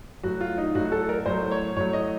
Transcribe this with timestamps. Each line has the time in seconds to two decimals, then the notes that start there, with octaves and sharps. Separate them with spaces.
0.23 A2 F#3 F#4
0.41 F4
0.58 D#4
0.75 A2 F#3 F#4
0.92 A4
1.09 A#4
1.26 A2 F#3 C5
1.51 C#5
1.76 A2 F#3 C#5
1.93 D#5